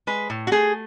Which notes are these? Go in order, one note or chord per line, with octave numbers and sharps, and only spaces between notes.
G#3 B4
A2
F#4
A3 G#4